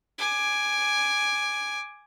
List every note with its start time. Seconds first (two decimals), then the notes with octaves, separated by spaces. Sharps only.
0.19 G#5 D6